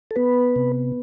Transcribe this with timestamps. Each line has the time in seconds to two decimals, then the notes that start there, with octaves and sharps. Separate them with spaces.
0.11 A4
0.16 B3 B4
0.56 C3